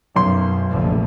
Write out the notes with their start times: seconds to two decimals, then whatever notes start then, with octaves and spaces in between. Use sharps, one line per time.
0.16 B1 F#2 C6
0.70 F1 A#1 D3